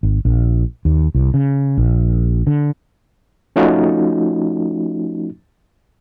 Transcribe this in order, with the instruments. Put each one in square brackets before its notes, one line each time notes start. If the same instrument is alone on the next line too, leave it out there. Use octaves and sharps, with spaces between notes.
[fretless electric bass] G#1
A#1
D#2
C2
C#3
A#1
D3
[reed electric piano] F3 A3 C#4 D#4 F4 F#4